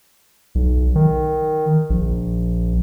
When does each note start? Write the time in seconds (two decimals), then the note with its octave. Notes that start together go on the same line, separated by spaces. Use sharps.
0.55 B1
0.96 D#3
1.90 A#1